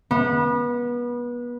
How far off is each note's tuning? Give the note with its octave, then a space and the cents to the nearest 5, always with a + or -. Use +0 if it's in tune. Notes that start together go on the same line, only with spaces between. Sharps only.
B3 -30